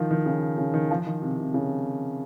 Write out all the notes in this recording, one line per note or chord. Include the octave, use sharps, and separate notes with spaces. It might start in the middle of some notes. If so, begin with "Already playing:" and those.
Already playing: D#3 F3
D#3
C#3
C#3
D#3
F3
D#3
C3
C3
C#3